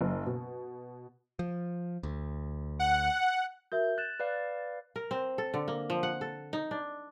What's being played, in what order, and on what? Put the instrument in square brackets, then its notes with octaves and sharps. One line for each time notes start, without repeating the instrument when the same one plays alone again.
[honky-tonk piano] F#1
B2
[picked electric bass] F3
D2
[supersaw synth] F#5
[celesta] F#4 A#4 E5 [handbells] G6
[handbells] F#6 [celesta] A6 E7
[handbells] B4 D5 F5
[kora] A#4
C4
A4
D3
A#3
F3
F#5
A4
D#4
D4